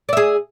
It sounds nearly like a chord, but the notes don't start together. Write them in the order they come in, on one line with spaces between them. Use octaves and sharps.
D5 E5 G#4